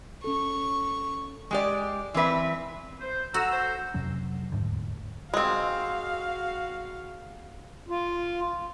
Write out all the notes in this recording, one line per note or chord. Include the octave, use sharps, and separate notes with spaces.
C#4 A4 C#6
G#3 G4 D5
E3 C4 B4 E5
C5
F#4 A4 A#5 E6
C5
F2 C3 F#3 C#4
D#1 D2 G#2 D3
G#3 C4 F#4 F5
F4